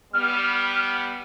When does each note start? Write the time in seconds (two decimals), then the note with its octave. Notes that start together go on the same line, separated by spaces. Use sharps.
0.13 G3 B3 F6